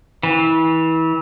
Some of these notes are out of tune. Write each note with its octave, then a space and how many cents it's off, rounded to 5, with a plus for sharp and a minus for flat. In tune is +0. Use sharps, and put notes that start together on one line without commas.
E3 -30